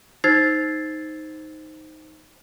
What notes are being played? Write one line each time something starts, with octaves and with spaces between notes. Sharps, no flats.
D#4 C5 E6 G#6 A6 C7